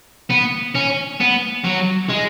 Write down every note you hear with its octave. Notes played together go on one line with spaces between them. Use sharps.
B3
C#4
B3
F#3
G#3